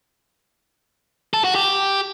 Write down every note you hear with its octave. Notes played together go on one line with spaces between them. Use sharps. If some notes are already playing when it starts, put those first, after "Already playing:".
A4
F#4
G4